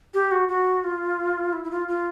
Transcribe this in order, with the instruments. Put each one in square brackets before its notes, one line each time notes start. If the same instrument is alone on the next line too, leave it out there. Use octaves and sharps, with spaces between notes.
[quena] G4
F#4
F#4
F4
E4
E4
F4
F4